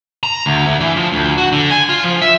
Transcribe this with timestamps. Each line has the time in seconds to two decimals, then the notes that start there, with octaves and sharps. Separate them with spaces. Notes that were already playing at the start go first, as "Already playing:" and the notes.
0.23 A#5
0.46 D2
0.66 D2
0.81 E3
0.96 F3
1.13 D2
1.38 F#4
1.52 D3
1.70 G#5
1.89 F4
2.04 F3
2.22 E5